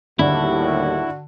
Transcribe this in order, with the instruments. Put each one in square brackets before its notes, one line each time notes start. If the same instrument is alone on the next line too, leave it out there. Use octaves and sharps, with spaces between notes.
[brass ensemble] D#2 A2 G3 [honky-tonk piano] D3 D4 [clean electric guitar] E4 [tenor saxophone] F#4